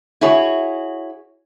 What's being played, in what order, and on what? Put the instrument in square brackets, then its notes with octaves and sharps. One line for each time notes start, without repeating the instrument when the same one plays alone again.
[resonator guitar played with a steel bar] E4 F#4 G#4 C#5